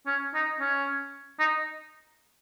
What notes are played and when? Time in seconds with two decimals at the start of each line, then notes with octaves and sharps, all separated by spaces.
0.07 C#4
0.34 D#4
0.60 C#4
1.39 D#4